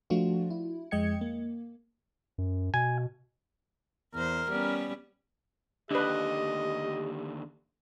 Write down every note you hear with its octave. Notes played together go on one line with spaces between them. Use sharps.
F3 A3 D4 F4 F#4
E4
F2 G#3 D#5 G5 G#6 C#7
A#3
F#2
B2 G#5
E2 A#4 C5
G3 B3 C#4
D#2 D3 D4 G4 B4 D#5